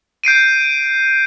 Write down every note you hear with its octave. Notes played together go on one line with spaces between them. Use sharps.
G6 C7 D7 D#7